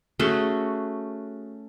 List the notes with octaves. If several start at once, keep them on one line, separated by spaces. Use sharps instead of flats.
A3 C#4 F#4 G#4